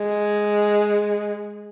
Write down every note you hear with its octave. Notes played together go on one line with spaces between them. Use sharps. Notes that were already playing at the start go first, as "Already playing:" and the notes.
Already playing: G#3